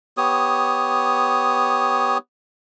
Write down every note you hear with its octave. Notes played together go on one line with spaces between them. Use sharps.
B3 G4 C#5 D#6